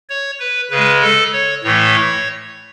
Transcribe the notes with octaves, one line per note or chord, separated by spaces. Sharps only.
C#5
B4
C#3 B4
G#3
A4
C#5
A2 E3 A3 C#5